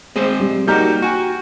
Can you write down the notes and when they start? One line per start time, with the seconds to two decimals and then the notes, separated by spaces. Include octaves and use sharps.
0.16 G#3 C4 G#4 C5
0.40 G3
0.68 G3 A#3 D#4 F#4 G4 A#5 F6 G6
1.02 F#4 G5 G#5 C#6